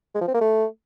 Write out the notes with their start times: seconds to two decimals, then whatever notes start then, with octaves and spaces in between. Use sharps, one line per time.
0.14 G#3
0.21 F3
0.28 C4
0.34 A#3
0.41 A3